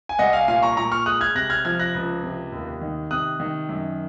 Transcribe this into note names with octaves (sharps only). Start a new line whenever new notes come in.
G#5
C2 D#5 F#5
F5 G#5
A#2 F5 G#5
A#5 C#6
A#2 A#5 C#6
C#6 F6
G#3 D#6 F#6
F6 G#6
C3 F#6 A#6
F6 G#6
F3 F6 G#6
F#6 A#6
C#2
C3
D#2
D#3
C3 D#6 F#6
D#3
F#2